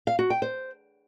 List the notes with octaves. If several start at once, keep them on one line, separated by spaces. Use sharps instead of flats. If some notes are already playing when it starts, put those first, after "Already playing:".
F5
F#4
G5
C5